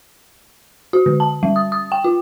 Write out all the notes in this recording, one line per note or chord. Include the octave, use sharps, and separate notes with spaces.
F#4
D3
A5
G3
D#6
D#6
G5
F4